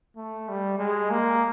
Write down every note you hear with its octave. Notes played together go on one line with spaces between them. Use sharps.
A3
G3
G#3
A#3